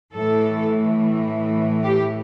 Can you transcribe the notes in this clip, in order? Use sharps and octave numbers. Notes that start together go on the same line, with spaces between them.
A2 E3 A3 A4
G4